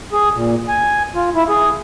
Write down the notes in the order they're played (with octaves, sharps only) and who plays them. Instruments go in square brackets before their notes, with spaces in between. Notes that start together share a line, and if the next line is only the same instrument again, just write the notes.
[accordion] G#4
A#2
G#5
F4
E4
G#4